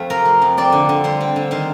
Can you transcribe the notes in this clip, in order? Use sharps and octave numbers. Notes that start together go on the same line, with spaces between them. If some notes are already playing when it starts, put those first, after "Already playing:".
Already playing: F2 F3 A3
C3 A#4
F3
F2
C4 D5
D3
D3
G3 C5
C4
D3
D#3 C5